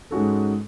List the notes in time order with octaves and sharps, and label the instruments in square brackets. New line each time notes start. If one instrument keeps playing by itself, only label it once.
[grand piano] G#2 G#3 C#4 F#4 A4